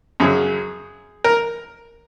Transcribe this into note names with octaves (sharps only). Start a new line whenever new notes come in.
F#2 C#3 F#3 G#4
A#4